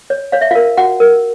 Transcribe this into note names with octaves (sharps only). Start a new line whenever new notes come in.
C#5
C#5 F5
E5
F4 A#4 F5
F#4 F#5
A#4